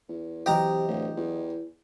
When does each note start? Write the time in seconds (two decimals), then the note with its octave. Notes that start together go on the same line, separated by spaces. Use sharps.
0.09 E2
0.46 C3 E3 F#3 G4 D#5 A#5
0.88 D1
1.17 E2